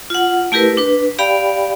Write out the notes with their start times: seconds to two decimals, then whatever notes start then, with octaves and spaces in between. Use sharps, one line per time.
0.10 F4 F#5
0.52 A3 E4 G4 A#4 B4
0.77 D4 B4
1.19 G4 D5 F5 G5 B5